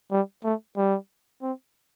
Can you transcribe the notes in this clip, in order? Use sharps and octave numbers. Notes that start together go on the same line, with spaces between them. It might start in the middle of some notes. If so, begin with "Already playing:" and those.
G3
A3
G3
C4